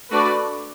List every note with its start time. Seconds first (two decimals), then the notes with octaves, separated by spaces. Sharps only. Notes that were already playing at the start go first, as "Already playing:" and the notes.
0.11 A3 D4 F#4 B4 D5